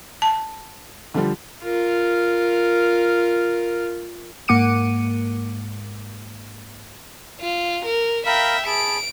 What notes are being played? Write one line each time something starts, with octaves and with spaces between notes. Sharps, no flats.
A5
D3 F3 G3
F4 A#4
G#2 A#3 F#5 D6 C#7 D#7
F4
A#4
A#4 E5 F5 G5 B5
G#4 A5 B5 D7